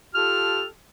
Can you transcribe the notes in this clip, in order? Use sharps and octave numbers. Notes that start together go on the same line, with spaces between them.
F4 G4 A4 A5 F6